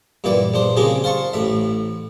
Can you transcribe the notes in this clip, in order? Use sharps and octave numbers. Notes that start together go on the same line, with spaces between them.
G2 A#2 E3 D5 G5
A#1 D4 C5
C#3 F3 A#3 C4 G4 G#4
C5 F5 A5 C#6
A1 A2 E5